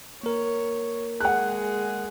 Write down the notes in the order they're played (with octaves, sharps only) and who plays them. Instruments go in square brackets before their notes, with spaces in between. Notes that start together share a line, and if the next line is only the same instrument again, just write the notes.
[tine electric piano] A#3 A#4 [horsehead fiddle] C#5
[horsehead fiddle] G#3 G#4 [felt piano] F#5 F#6